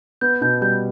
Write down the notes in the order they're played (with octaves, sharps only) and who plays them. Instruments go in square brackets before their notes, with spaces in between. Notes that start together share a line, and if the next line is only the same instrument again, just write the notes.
[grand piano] B3 [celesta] G6
[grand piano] B2 [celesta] G6
[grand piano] G3 [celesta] G6